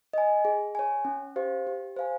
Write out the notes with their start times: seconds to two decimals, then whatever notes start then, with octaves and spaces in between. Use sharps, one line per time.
0.14 D#5 G#5
0.45 G#4
0.75 C#5 G#5
1.05 C#4
1.36 G4 C5 F5
1.67 G4
1.96 C5 F5 G#5